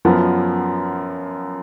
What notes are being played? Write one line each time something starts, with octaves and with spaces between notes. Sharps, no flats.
F#2 F3 B3